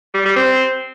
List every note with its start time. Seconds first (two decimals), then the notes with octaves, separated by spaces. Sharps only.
0.14 G3
0.25 G3
0.36 C4